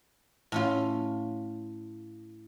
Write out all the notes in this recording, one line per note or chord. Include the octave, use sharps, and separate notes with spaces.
A2 C#4 F4